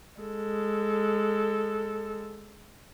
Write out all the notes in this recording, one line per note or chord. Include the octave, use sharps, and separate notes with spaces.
G#3 A4